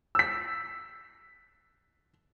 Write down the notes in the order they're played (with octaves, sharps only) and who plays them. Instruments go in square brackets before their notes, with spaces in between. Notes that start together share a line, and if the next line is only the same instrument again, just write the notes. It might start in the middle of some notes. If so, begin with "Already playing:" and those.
[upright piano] E6 B6